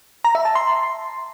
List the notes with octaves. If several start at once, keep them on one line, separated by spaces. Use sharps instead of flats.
A#5
E5
A5
C6